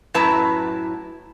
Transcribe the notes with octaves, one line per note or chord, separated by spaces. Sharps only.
F#2 A2 E4 B4 A5 A#5